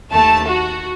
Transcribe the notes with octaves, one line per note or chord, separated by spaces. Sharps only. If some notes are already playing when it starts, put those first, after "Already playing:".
D#2 A3 A5
F#4